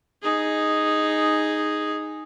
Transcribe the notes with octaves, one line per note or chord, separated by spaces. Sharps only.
D#4 G#4